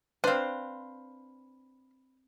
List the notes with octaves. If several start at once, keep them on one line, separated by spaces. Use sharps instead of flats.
C4 D4 B4 C5 F5